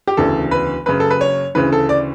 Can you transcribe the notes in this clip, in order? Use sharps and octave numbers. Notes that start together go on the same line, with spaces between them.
G4
E1 D2 C#3 E3 A4
B4
F#1 F#2 C#3 B4
A4
B4
C#5
D2 C#3 E3 B4
A4
D5